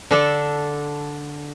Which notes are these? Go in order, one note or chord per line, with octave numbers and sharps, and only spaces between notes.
D3 D4 A4